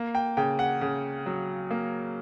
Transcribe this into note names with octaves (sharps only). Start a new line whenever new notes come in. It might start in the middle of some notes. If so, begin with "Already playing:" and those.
Already playing: A#3
G5
C#3 G5
F#5
C#3
F#3
A#3